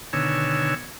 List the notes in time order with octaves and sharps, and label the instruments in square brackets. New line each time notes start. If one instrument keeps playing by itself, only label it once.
[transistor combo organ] B2 D3 D#3 C#5 G#5 E6